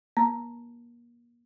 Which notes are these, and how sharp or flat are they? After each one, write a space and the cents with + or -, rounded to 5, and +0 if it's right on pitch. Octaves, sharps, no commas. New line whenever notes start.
A#3 +35 A#5 +0